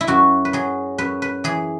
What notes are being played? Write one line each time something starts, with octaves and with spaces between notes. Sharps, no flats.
E4
F#2 F#4
B4
F#3 G#4
F#2 B4
B4
E3 G#4